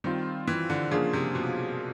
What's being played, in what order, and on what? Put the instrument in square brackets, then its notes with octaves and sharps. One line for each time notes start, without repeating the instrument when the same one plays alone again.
[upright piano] D#3 [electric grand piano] G3 C4 F4
[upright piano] E3
D3
[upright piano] C#3 [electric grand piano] F3 A#3 D4 F4 G#4
[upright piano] C3
B2